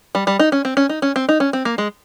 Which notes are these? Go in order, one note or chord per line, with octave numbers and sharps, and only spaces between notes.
G3
G3
D#4
C#4
C4
C#4
D#4
C#4
C4
D#4
C#4
C4
A#3
G#3